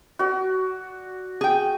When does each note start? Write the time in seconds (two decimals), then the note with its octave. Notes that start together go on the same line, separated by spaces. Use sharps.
0.19 F#4 D5
1.41 G#4 G5